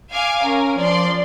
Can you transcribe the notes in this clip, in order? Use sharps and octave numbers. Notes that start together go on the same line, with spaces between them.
F5 G#5 D6
C#4 A#4
F3 D5 C6